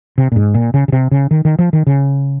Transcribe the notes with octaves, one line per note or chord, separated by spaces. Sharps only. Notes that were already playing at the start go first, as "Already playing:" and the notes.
C3
A#2
G#2
A#2
C#3
C#3
C3
C#3
D#3
D#3
F3
D#3
C#3